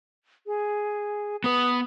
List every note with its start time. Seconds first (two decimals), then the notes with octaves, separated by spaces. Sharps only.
0.47 G#4
1.44 B3 B4 D#6